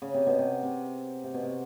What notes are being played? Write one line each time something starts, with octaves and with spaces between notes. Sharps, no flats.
C#3
C3
B2
C3
C3
C3
B2
C3